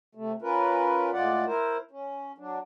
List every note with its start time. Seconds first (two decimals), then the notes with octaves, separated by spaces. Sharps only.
0.15 C3 A3
0.42 C#4 F4 A#4 B4
1.13 A2 G#3 F4 D5 F#5
1.46 E4 A#4 C5
1.91 C#4
2.38 F#3 D4